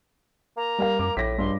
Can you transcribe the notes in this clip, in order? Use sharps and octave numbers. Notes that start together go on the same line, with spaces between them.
A#3 A#5
G3 A#4 F5
F#2 A#3 D6
A#1 A2 A#6 B6
C#2 G2 C6